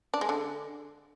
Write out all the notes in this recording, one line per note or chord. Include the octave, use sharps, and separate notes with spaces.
D4
G#3
D3